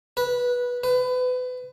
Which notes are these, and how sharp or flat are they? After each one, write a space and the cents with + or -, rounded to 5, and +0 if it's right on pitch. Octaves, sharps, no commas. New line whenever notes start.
B4 -15
B4 +30